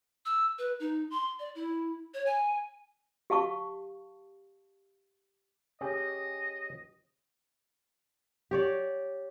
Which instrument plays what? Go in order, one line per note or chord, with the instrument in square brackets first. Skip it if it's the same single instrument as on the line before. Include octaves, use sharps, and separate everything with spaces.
[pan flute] E6
B4
D#4
C6
D5
E4
C#5
G#5
[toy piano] G4 F5 A5 C#6
[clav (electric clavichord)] C#4 G4 G#4 [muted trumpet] D#5
[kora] G4 C#5 D5